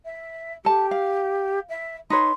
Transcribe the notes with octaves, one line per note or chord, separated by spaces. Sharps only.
E5
G4 A4 A5
F5
E5
D#4 B4 C#5 C6